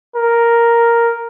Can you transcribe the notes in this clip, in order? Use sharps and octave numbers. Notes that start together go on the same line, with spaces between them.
A#4